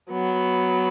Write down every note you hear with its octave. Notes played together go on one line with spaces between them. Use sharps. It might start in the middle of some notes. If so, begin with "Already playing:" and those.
F#3 B3